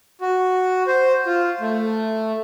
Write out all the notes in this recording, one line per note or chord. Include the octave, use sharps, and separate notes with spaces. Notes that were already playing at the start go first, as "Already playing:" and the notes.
F#4
C5
F4
A3